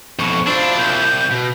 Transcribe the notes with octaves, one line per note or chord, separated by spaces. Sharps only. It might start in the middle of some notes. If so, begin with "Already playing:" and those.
F2 B2 C#6
D4 E4 F4 C5
C2 G6
B2